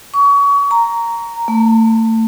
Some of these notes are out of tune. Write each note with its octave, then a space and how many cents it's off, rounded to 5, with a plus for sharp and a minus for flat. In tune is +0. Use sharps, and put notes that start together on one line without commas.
C#6 +30
A#5 -5
A3 +30